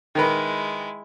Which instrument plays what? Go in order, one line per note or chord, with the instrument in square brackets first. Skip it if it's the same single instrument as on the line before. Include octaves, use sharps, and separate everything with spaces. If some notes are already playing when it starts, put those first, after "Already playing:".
[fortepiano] D#3 A#4 B4 [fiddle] G#3 E4